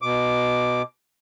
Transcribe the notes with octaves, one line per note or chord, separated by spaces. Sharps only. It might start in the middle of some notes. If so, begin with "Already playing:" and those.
B2 D6